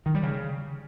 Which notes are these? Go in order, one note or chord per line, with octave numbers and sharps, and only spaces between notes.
D#3
G3
C#3